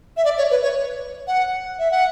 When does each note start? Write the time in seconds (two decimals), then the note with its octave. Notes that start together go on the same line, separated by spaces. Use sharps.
0.17 E5
0.25 D5
0.38 C#5
0.51 B4
0.63 C#5
1.27 F#5
1.79 E5
1.91 F#5